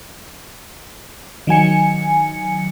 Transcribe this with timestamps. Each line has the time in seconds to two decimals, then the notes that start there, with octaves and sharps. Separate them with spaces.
1.47 D#3 F#3 G#5 C#7